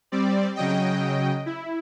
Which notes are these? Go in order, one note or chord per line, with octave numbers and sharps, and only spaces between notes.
G3 C4 D5
C#3 F#3 D#5 G5
E4